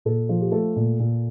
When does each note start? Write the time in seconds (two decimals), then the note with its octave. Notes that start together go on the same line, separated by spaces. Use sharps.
0.05 A#2 A4
0.29 F3
0.41 G4
0.52 A3 A4
0.76 A#2
0.99 A#2